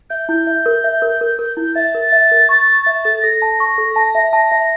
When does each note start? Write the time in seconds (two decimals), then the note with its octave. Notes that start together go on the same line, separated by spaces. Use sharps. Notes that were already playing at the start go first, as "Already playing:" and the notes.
0.10 E5 G6
0.29 E4 G6
0.47 E5
0.66 A#4
0.84 E5
1.02 A#4
1.21 A#4
1.39 A#4
1.57 E4
1.75 E5 A6
1.95 A#4
2.12 E5
2.31 A#4
2.49 C#6
2.68 C#6
2.86 E5
3.05 A4
3.22 A4 A#6
3.42 A5
3.60 C#6
3.78 A4
3.96 A5
4.15 E5
4.33 A5
4.52 E5